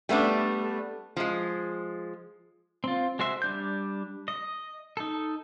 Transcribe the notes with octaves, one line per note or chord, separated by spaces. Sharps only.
G3 A3 B3 D4
F3 G#3
C4 F4
G#3 F#4 C5 E5
G3 D4 G6
D#5
D#4 A4